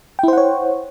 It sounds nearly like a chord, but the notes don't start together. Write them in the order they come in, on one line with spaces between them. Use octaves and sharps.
G5 E4 C5 F#5 C#5